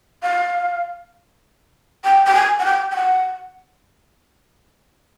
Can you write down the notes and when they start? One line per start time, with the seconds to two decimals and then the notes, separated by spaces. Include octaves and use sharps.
0.23 F5
2.04 G5
2.26 G5
2.35 G#5
2.59 F#5
2.65 G5
2.91 G5
2.96 F#5